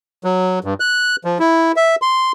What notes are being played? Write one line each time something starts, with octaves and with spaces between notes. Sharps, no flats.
F#3
G2
F#6
F3
E4
E5
C6